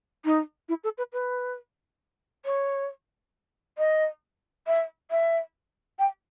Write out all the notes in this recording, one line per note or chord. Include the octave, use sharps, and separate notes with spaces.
D#4
E4
A4
B4
B4
C#5
D#5
E5
E5
G5